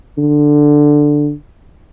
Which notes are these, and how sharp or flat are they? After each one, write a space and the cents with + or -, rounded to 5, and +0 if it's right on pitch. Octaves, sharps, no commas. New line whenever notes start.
D3 +5